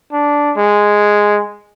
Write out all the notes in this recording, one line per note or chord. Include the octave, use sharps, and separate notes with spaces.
D4
G#3